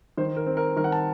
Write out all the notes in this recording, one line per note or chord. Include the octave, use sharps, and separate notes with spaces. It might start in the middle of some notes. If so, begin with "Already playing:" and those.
D#3 C5
A#4
C4
A#4
D#3 A#4
F#5
A5